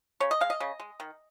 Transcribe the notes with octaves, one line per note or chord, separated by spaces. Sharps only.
C#3 C#5
D#5
G#3 F5
D#5
C#3
G#3
D#3